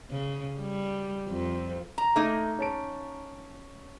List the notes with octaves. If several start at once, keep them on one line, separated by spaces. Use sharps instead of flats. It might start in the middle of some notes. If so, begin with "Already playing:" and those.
C#3
G3
F2
A#5
A3 A#3 D#4
C#4 A5 D7